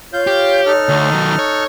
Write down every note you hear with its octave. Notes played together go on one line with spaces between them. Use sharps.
F4 C#5 F5 G6
G4
D#4 A4 F6
D2
D#3 F#3
C#5